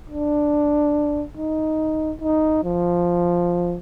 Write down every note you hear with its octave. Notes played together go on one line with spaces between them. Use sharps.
D4
D#4
D#4
F3